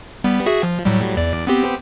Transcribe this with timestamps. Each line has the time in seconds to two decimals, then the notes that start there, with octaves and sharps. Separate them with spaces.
0.24 G3 B3
0.46 F#4 G#4 E5
0.63 F3
0.85 A2 F#3 G3
1.17 E2 D5
1.47 B3 C4 G4